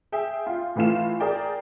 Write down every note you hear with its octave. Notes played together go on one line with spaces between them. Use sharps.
G#4 E5 G5
F4
A2 E3 A3 F4 E7
G#4 A#4 D5 G5